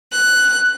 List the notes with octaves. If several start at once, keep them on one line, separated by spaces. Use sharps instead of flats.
F#6